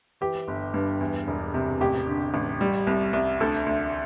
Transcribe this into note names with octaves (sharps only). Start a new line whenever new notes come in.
E3 G4
G1
G2
E2
E1
C3
A1 G4
D3
A1
G3
C2
C2
D2 A4
D2